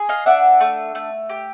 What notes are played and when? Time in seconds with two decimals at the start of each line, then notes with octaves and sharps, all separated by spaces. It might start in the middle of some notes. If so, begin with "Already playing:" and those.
Already playing: G#4
0.09 D#5 F5
0.26 D4 E5 F#5
0.60 A3
0.95 A3
1.30 G4